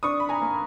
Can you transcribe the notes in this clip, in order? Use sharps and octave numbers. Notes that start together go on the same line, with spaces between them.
D4 C#6 D#6
B5
G#5 A#5
A#3